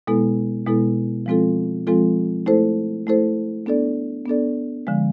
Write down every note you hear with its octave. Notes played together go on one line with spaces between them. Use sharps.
B2 G#3 B3 E4 A4
B2 G#3 B3 E4 A4
F3 G#3 C4 F4 A4
F3 G#3 C4 F4 A4
A3 E4 A4 C5
A3 E4 A4 C5
B3 D4 A4 D5
B3 D4 A4 D5
D3 F3 G#3